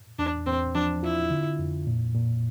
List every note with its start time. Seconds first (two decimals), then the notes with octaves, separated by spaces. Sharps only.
0.19 E2 D4
0.46 E2 C4
0.74 F3 D4
1.03 E4 F4
1.30 D3
1.59 F2
1.87 A#2
2.15 A#2